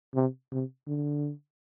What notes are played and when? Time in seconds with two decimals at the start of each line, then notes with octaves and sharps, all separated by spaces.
0.15 C3
0.52 C3
0.87 D3